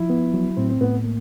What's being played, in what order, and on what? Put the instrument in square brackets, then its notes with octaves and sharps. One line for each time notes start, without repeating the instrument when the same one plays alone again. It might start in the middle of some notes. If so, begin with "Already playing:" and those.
Already playing: [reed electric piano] F3 [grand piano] E4
[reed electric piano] B3
F#3
[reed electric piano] A2 [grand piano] C4
[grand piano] C4
[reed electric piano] A2 [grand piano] B3
[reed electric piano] A#3